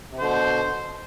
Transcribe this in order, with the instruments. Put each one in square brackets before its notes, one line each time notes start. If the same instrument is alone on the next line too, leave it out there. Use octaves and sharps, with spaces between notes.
[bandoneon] C3
[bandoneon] B2 D3 [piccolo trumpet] C5